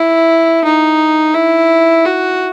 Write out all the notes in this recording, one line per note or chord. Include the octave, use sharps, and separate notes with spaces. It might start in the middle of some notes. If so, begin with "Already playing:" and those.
Already playing: E4
D#4
E4
F#4